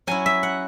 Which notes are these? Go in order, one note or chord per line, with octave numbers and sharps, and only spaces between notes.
F#3 C#4 E4 G#5
E5
F#5